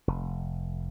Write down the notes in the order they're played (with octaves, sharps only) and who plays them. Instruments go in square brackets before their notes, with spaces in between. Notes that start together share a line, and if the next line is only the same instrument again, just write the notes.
[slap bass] F1